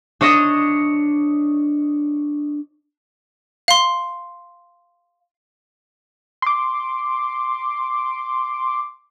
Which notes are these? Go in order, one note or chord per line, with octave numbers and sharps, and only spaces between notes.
D4 C#5 D#5 A#6 E7
F5 C6
C6 D6